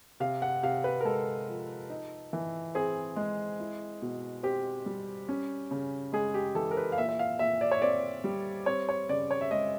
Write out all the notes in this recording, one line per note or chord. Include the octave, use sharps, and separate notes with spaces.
C3 F5
F#5
C3 F5
B4
A#4
G#3 A4
F3
D#4
E3
C4 G#4
G#3
E4
B2
C4 G4
G3
C#4
C#3
G#3 G#4
G4
E3 A4
A#4
B4
F5
A#2 E5
E5
F5
A#2 E5
D5
C#5
C4 D5
G3
C4 C#5
C#5
C#3 D5
C#5
E5
G#3 D#5